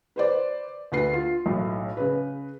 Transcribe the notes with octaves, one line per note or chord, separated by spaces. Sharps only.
B4 C5 D5
D2 B4 C7
F4
B1 A2
C#3 B4